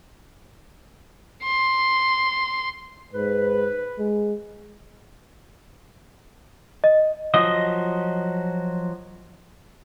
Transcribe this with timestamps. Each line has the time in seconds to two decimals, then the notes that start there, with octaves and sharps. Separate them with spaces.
1.43 C6
3.13 G#2 B4
3.99 G#3
6.84 D#5
7.34 F3 F#3 D#5 D#6